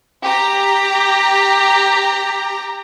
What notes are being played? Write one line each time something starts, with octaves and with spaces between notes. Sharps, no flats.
G4 A#5